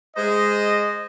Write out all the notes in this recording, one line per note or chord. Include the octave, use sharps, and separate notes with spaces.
G#3 C5 D#5